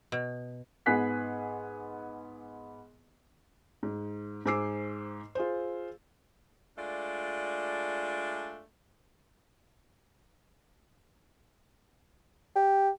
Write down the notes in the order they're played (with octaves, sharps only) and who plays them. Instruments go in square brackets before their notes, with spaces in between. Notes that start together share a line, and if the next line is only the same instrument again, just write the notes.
[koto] B2
[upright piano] G#2 B3 G#5 F#6 B6 C7
[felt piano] G#2
G#2 C5 G#5 D6 E6 C7
F4 G#4 C5
[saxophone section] G#3 A3 D4 F4 D5
[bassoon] G4